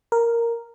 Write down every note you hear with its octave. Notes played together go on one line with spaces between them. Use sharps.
A#4